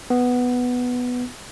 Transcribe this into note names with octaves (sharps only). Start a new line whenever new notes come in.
B3